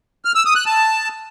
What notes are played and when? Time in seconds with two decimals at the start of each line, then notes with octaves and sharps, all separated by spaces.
0.25 F6
0.35 E6
0.45 D#6
0.56 F#6
0.66 A5